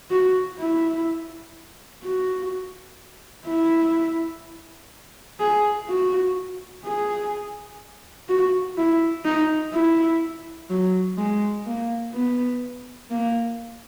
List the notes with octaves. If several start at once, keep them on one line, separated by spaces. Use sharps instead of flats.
F#4
E4
F#4
E4
G#4
F#4
G#4
F#4
E4
D#4
E4
F#3
G#3
A#3
B3
A#3